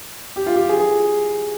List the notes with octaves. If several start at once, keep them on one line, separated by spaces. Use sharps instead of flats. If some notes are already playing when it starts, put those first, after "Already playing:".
G4
F4
G4
G#4
G#4